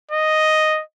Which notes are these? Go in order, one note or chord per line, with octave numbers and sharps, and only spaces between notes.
D#5